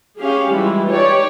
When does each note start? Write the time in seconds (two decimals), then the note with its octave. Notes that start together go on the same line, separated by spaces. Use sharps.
0.19 C#4 G4 G#4 F5
0.52 E3 G3 G#3 E4 F4
0.90 D#4 G4 C#5 D5